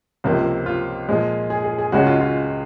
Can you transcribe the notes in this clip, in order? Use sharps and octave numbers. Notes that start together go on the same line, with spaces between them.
C#2 C3 F3 A#3 F4
F4
A#2 F3 G#3
G#4
G#4
G#4
C#2 C#3 G#3 F#4
F4
F4